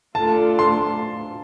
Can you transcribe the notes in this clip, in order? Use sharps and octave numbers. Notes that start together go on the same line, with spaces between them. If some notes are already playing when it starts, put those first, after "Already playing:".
A3 D4 F4 A4 A5
C6